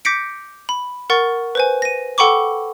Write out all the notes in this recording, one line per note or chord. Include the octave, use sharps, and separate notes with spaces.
D6 G6 A#6 B6 C#7 D7
B5
A#4 F#5 C#6 A6
B4 C5 G#5
A#6 D#7
A4 F#5 G5 B5 C#6 D6